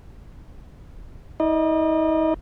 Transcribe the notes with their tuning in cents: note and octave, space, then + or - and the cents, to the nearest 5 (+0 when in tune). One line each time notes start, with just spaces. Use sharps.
D#4 +45 D#5 -40